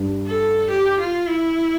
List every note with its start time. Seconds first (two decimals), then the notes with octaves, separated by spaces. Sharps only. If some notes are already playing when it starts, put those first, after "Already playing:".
Already playing: G2
0.27 A4
0.70 G4
0.99 F4
1.28 E4